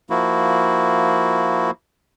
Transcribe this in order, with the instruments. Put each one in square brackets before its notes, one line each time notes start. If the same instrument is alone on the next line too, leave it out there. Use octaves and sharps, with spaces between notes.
[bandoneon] F3 A#3 E4 F#4